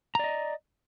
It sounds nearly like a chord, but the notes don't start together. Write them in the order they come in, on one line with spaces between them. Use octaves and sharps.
A#5 D5 D#5